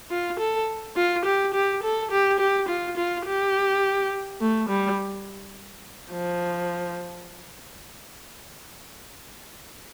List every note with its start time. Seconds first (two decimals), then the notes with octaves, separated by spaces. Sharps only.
0.10 F4
0.39 A4
0.96 F4
1.25 G4
1.54 G4
1.83 A4
2.11 G4
2.39 G4
2.68 F4
2.97 F4
3.26 G4
4.40 A3
4.69 G3
6.12 F3